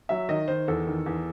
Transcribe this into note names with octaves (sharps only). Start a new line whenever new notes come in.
F#3 E5
D#3 D#5
D#3 C5
E2 A4
D#3
E2